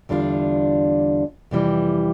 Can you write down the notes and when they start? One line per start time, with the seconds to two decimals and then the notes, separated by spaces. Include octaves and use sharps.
0.09 E2 D3 G3 D4 F4
1.51 F2 C3 E3 G3